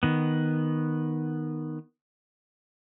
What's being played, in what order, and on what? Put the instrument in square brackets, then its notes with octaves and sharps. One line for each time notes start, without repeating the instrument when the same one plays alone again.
[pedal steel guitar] D#3 B3